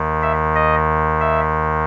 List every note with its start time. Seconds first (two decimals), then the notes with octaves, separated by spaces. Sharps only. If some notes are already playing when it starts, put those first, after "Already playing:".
Already playing: D#2 D#3
0.23 E5
0.55 D#5
1.21 E5